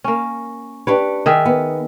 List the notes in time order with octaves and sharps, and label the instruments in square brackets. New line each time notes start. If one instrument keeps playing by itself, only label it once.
[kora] A#3 C#4
[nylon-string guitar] D4 G4 B4 [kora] C#5
[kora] D#3 G#4 E5
[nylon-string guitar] B3